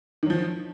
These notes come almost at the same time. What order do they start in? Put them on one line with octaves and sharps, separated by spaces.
D#3 F#3 F3